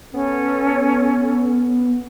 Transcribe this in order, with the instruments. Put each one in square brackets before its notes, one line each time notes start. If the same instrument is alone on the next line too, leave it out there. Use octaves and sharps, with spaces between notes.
[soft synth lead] B3 [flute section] C#4 A4